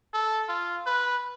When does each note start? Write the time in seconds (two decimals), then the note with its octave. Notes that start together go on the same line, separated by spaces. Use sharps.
0.14 A4
0.49 F4
0.86 B4